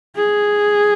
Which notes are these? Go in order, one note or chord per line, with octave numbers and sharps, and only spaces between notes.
G#4